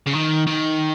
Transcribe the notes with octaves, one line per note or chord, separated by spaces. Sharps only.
C#3
D#3
D#3